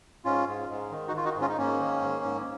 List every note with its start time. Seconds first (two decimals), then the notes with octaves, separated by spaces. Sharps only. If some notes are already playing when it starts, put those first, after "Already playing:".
0.25 G#2 C#4 F4
0.47 G#2
0.69 G#2
0.91 D#3
1.08 D#4 F#4
1.13 D#3 F4
1.25 D#4 F#4
1.36 G#2
1.41 C#4 F4
1.50 D#4
1.58 G#2 A#3 C#4
1.80 D#3
2.01 G#2
2.24 G#2